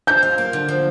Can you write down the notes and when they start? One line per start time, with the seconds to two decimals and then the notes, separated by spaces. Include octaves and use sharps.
0.07 F3 G6
0.23 F4
0.38 A#3
0.53 D3
0.68 F3